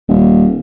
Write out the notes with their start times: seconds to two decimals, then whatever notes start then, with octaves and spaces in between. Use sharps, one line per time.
0.08 D#1